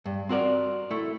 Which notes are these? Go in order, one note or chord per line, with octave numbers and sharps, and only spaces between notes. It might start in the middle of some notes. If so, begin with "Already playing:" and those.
G2
C4 F#4 A#4 D5
A3 E4